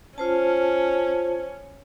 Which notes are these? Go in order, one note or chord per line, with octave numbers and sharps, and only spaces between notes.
C#4 F4 C5 A5